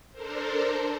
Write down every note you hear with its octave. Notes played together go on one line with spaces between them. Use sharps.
D4 A4 A#4 C5